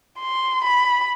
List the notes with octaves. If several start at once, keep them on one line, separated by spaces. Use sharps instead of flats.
C6
B5